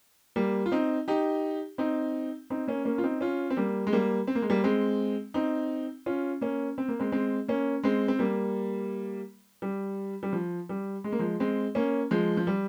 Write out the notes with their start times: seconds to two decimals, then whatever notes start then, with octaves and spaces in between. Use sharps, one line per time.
0.36 G3 A#3
0.66 F4
0.72 C4 D#4
1.08 D#4 G4
1.78 C4 D#4
2.50 C4 D#4
2.67 A#3 C#4
2.85 A#3 C#4
2.98 F4
3.03 C4 D#4
3.21 C#4 F4
3.50 C4
3.57 G3 A#3
3.87 G#3
3.93 G3 A#3
4.27 C4
4.35 A#3
4.42 G#3
4.50 G3 A#3
4.64 G#3 C4
5.34 C4 D#4
6.06 C#4 F4
6.41 A#3 C#4
6.78 C4
6.88 A#3
7.00 G#3 C4
7.12 G#3 C4
7.48 A#3 C#4
7.83 G#3 C4
8.08 C4
8.19 G3 A#3
9.62 G3
10.23 G3
10.33 F3
10.69 G3
11.04 G#3
11.12 A#3
11.19 F3 G#3
11.40 G#3 C4
11.75 A#3 C#4
12.11 F3 G#3
12.37 F3
12.47 G3